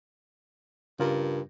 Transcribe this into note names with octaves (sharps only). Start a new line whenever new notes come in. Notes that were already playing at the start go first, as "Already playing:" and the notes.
G2 C#3 F4 A#4